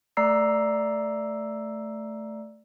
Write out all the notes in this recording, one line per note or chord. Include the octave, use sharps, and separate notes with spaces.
A3 D5 A#5 E6 C7